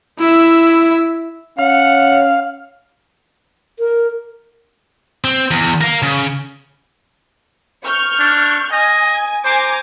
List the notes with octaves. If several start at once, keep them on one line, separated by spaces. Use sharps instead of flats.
E4 E5
C#4 F5 F#5
A#4
C4
E2
A#4 F5
C#3
C#6 F6 G6
D4
D#5 G#5
C5 G#5 A#5 D6